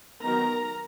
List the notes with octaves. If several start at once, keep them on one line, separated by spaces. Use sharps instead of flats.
D#3 F#3 B3 D#4 A#4 A#5